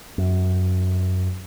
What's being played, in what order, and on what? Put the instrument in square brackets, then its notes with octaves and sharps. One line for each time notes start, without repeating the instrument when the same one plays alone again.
[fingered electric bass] F#2